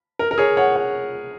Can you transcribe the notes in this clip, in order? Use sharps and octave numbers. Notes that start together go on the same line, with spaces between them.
A#4
A#4
G#4 C#5
C#5 F#5
C#5 F#5